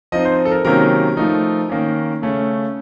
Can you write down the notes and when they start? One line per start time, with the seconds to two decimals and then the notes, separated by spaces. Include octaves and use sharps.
0.12 F3 C4 D#4 D#5
0.25 C5
0.45 A4
0.51 A#4
0.65 C3 D#3 F#3 A#3 C#4 A#4
1.17 F3 A3 D#4
1.69 D#3 A#3 C#4
2.22 C#3 A3 C#4